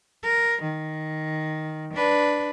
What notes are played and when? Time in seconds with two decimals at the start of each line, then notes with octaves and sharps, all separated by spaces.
0.23 A#4
0.63 D#3
1.94 D4 B4